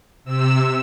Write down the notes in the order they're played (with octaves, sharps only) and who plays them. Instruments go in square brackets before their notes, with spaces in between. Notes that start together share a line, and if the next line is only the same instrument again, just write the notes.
[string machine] C3 E6